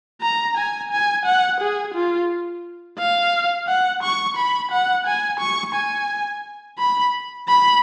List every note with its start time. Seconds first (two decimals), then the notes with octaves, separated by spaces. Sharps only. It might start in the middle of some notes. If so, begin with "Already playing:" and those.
0.22 A#5
0.57 G#5
0.91 G#5
1.25 F#5
1.61 G#4
1.95 F4
2.99 F5
3.68 F#5
4.03 C#6
4.37 B5
4.71 F#5
5.06 G#5
5.40 C#6
5.74 G#5
6.79 B5
7.48 B5